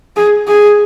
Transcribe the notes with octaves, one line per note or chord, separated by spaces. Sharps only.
G#4
G#4